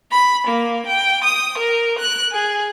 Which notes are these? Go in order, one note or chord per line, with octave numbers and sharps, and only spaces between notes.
B5
A#3
G5
D#6
A#4
F#6
G#4